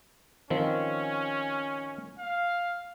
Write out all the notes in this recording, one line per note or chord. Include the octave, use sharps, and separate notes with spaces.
D#3 F3 C4 C#4
F5